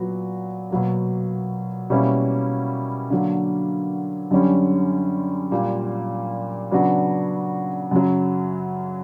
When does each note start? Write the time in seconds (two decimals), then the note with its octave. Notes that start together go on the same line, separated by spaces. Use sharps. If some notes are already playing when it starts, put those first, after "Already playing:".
Already playing: A#2 F#3 B3 F#4
0.70 B2 F#3 A#3
1.90 B2 G3 A#3 C#4 E4
3.10 D3 F#3 A#3
4.31 F#2 D3 G3 C#4
5.51 A#2 G3 A#3
6.72 C#3 F#3 B3 D4 F#4
7.91 F#2 C#3 F#3